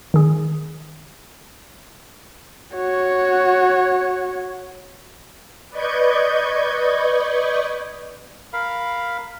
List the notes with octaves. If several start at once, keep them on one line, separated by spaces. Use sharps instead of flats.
D#3 G#4
F#4 C#5
B4 D5 D#5 C#6 G6 G#6
A#4 F5 B5